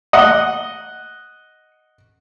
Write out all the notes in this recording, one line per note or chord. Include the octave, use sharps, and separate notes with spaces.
D#5 F#5